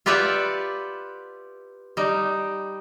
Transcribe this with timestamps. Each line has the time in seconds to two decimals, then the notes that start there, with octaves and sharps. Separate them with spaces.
0.06 F4 G4 B4 D5 E5 F#5
1.97 G3 D#4